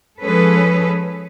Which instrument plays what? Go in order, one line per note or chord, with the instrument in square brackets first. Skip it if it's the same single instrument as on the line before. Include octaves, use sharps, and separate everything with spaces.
[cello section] F3 G#3 C#4 G#4 A4 B4